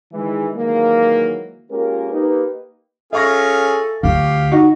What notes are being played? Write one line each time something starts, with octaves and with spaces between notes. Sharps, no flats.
D#3 E3 G#3
D#3 E3 F#3 G#3 A#3
G#3 A#3 C#4 F4 G4 A#4
A#3 D#4 G4 B4
C#4 F4 G#4 A4 E5 C#6 A#6
D2 F4 G4 F5
D#4 F#4